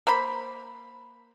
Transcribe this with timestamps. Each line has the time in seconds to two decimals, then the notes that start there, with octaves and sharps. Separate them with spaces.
0.07 A#3 C5 B5